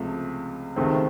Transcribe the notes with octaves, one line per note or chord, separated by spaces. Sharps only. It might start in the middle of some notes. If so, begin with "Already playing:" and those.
Already playing: C#2 C3 F3 A3
C#2 C3 D#3 A3 C4